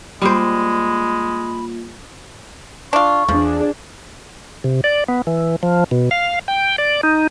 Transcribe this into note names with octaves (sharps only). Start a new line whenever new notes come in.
G3 G#3 A#3 F4 C5 B5
D4 F4 C#6
E2 F3 D4 G#4
C3
D5
B3
E3
F3
B2
F5
G5
D5
D#4